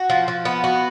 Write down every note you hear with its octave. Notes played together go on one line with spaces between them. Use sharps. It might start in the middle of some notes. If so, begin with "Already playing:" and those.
Already playing: F#4
F3
F3
B3
F#4